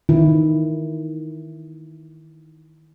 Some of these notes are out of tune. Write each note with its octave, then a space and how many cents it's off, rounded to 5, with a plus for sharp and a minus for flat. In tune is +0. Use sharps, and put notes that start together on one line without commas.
D#3 +0 E4 +0